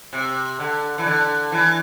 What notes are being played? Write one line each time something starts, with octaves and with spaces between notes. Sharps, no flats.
C3
D3
E3
D3
E3